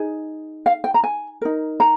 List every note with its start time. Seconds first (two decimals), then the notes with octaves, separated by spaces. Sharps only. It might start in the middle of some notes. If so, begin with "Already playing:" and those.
Already playing: D#4 G#4
0.66 F5
0.84 G5
0.94 A#5
1.04 G#5
1.42 D#4 A#4
1.80 A#5